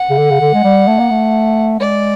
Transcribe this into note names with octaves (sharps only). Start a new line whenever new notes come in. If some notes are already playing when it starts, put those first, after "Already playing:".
Already playing: F#5
C#3
D3
C#3
D3
G#3
G3
A3
A#3
A3
G#3 D5